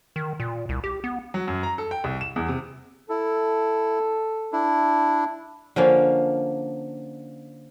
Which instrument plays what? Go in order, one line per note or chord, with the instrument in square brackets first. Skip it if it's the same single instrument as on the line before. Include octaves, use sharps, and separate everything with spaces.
[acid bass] D#3
A#2
C2
G4
B3
[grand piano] F#3
F#2
A#5
A4
G5
C2
E7
E2
C3
[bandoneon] E4 [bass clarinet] A4
[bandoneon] D4 E4
[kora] D3 F3 A#3 C#4